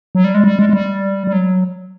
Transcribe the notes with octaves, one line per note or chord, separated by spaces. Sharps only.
F#3
G3
G#3
G3
G#3
G#3
G3
G3
F#3